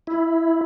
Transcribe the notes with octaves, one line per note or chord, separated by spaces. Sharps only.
E4